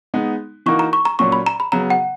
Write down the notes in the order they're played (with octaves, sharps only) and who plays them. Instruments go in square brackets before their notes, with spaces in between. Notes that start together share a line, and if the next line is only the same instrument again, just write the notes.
[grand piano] G#3 B3 D#4
[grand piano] E3 A#3 D#4 F#4 A#4 [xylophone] C#6
[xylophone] A#5
C#6
A#5
[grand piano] A#2 F#3 C#4 [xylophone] C#6
[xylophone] B5
A#5
B5
[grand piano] C#3 F#3 B3 [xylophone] A#5
[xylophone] F#5